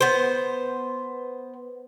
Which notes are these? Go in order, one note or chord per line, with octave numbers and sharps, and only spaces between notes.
B3 C5